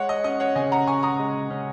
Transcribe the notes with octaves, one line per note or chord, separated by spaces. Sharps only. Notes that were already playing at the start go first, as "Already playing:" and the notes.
Already playing: G#3 C#5 F#5
D#5
C#4 D#5
C#5 F#5
C#3 D#5 G#5
F#5 A#5
C#3 G#5 C#6
A#5 D#6
G#3
C#4